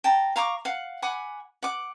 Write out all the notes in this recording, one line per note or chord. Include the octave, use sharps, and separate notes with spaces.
G5 A5 A#5
F5 A#5 C#6 D6
F5 F#5
F#5 G#5 B5 D6
F#5 D6